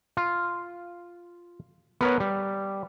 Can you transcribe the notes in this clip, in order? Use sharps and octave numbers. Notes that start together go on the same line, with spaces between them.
F4
B3 A#4 B4 C#5
G3